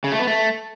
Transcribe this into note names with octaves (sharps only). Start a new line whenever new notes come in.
C#3
A3
B3
A3